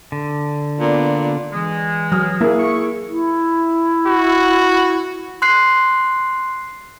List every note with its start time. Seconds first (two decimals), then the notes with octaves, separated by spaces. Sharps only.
0.12 D3
0.80 A#2 B3 D4 D5
1.53 E3 G#3
2.12 F#3 D#6 F6
2.41 A#3 E4 G#4
2.59 C#6
3.09 E4
4.08 F#4
5.42 C6 F#6 C7